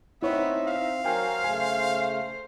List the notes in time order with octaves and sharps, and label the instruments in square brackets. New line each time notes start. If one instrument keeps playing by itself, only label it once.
[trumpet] B3 [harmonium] C4 [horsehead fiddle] D#4 E5 [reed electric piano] E4 C#5
[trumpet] F5
[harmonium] F#3 F#4 A#4 [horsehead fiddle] C5 [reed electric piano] G5 G#5 F6
[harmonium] C#3 A3 [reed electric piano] G#5